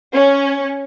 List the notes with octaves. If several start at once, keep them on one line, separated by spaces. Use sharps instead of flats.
C#4